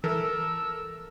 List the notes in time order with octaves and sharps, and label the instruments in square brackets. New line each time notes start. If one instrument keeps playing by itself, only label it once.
[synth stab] E3 [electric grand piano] A4 A#4 [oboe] E6